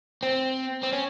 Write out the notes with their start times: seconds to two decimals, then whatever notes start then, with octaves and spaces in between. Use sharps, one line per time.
0.23 C4
0.83 C4
0.92 C#4